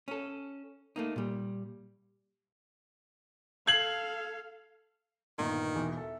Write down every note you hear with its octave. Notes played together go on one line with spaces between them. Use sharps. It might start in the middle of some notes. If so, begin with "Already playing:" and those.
C#4 A4
A3 A#3 D#4
A#2 G3
A4 F5 G#6 C7 F#7
G1 A#2 D#3
E1 E3
A4 E5